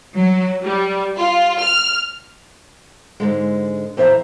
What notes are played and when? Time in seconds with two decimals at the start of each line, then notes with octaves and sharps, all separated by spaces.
0.17 F#3
0.64 G3
1.17 F4
1.59 F6
3.20 G#2 D3 G#3
3.97 F2 E3 C5 E5 A#5